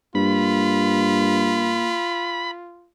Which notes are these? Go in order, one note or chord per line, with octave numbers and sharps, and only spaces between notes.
G2 A#3 F4 B5